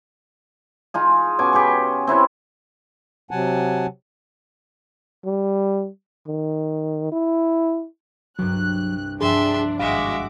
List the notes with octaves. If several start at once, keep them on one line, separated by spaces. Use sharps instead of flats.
D#4 F4 G#4
B2 C#4 G#5 D6
G4 G#4 B5 C#6
C4 E4 B4 C#5
C3 F#3 F#5 G#5 A5
G3
D#3
E4
C2 G2 F#3 F#6
G2 F3 D4 G#4 E5 G5 C6
G#1 G#3 F#4 E5 F5 D6